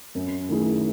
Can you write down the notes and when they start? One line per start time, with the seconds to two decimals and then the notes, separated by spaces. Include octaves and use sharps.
0.15 F#2
0.49 D#3 A3 E4 G#4